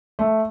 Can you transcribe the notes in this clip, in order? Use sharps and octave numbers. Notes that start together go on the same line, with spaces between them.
A3